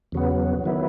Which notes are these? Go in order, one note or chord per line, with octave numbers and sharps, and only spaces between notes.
E2 C#3 F#3 B3
D#3 F#3 B3 E4